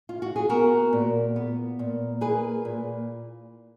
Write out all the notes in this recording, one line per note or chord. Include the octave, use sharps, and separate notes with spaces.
F4
F#4
G#4
B3 F#4 A#4
A#2
B3
A#2
A#3 G#4 B4
A#2